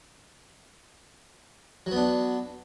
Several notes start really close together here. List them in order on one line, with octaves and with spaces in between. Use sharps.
F#3 B3 D4